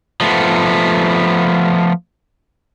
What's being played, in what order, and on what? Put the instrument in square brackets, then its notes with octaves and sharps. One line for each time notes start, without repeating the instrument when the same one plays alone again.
[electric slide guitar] F3 A3 B3